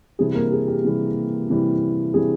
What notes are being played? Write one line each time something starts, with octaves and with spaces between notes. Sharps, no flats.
C3 E3 G3 G#4
A#3 A#4
G#4
G4
C3 E3 G3 G#4
C3 E3 G3
C3 E3 G3 G#4